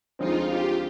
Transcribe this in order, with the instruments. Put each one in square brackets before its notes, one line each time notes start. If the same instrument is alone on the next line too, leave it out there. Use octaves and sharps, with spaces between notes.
[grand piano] D2 D3 F3 G#3 C4 [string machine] D#4 F4
[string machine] F4 G4